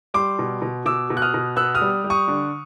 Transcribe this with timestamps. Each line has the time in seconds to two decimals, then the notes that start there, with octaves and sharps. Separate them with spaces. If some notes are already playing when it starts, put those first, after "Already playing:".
0.14 G3 C6 D6
0.39 B2
0.62 B2
0.86 B2 D6 E6
1.10 B2
1.17 F#6
1.22 D#6 F6
1.34 B2
1.57 B3 E6 F#6
1.75 D#6 F6
1.82 G3
2.04 G3
2.10 C#6 D#6
2.28 D3